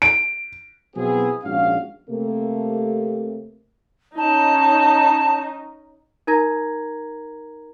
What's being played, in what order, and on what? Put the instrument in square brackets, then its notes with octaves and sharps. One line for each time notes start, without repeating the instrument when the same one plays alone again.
[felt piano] D7
[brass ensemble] B2 F#3 B3 C4 E4 G#4
A#1 G#2 C#4 F#4 F5
[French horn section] C3 A3 A#3
[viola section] C#4 D#4 [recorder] A5
[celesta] D#4 A#4 A#5 G#6 A#6